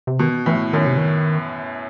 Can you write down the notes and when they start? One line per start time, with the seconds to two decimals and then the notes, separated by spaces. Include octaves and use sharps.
0.07 C3
0.19 B2 D#3
0.46 A2 E3
0.73 F#2 D#3
0.86 C3
0.97 D#3